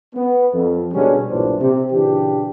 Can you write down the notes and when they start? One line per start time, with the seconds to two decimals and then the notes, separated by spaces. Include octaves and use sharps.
0.15 B3
0.53 F2
0.93 B2 D3 G3 G#3 C#4
1.29 B1 G2 A#2 E3 D4 C5
1.60 C3
1.92 A#2 C#3 E3 D4 G4